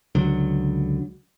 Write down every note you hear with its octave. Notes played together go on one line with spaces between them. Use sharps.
C#2 D3 F#3